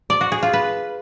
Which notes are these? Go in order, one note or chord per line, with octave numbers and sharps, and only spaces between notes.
D5
F#4
G#4
F4
B4